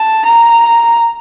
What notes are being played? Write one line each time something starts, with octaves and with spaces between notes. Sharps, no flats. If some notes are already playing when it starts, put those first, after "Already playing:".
Already playing: A5
A#5